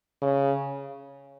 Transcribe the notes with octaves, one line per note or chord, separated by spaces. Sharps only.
C#3